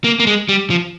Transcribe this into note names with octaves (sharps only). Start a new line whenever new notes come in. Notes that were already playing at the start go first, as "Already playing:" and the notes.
A#3
A#3
G#3
G3
F3